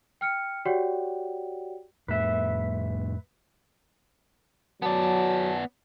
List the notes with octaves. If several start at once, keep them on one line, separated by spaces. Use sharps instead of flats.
G5 F6 C#7
F#4 G4 C#5 D5 F#5 G5
F2 A2 A3 B4 E5
F#3 B3 D5 A5